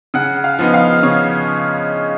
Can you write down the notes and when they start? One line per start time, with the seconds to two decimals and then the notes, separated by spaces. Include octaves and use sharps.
0.14 C#3 F#5
0.44 F5
0.59 F3 B3 D#4
0.74 F5
1.03 C#3 C#5